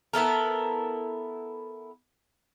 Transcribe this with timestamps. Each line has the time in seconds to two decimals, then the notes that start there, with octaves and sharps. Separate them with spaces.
0.13 B3 E4 A4 A#4